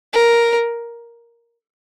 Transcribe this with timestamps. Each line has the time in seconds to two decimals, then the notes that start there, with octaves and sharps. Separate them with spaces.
0.13 A#4